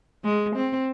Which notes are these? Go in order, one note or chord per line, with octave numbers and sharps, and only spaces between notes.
G#3
C4